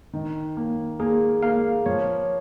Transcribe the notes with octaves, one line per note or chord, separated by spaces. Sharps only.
D#3
A#3
A#3 G#4
A#3 F5
F3 C#5